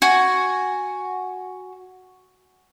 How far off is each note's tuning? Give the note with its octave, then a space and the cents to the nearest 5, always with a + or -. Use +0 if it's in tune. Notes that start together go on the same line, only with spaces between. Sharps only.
F#4 +0 G#5 +0